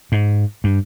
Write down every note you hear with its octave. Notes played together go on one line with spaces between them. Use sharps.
G#2
G2